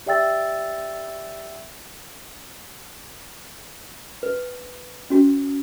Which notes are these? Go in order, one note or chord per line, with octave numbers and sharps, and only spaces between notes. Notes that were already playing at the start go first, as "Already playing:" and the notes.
G4 D5 E5 G5 E6 A6
B4
C#4 F#4